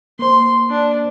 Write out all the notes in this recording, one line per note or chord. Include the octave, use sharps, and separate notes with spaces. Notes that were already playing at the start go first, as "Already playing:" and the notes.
A#3 C5 C6
D4